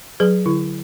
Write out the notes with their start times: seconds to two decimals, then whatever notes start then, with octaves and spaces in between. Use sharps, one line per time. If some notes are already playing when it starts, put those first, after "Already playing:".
0.20 F#3 G#4 B4
0.46 D3 E4